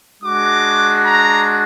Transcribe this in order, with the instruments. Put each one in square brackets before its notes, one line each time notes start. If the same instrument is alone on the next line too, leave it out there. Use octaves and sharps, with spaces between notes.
[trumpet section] G#3 D4 F#4 D6
A#5